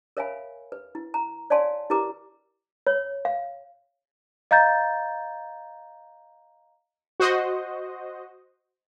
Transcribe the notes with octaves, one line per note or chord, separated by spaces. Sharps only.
A#4 C#5 E5 F5 G#5 B5
B4
E4
A#5
C#5 D5 F5 G#5 A5 C6
E4 G4 A#4 B4 A#5 D6
C#5
F5
D#5 F5 A#5 G6 A6
F#4 C5 D#5